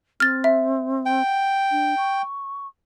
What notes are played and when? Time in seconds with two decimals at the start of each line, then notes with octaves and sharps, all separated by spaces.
0.20 C4 F6 A6
0.44 E5
1.06 G5
1.25 F#5
1.71 D4
1.97 C#6